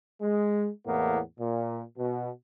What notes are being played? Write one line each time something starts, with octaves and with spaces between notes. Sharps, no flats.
G#3
E2 A2 A#3 B3
A#2
B2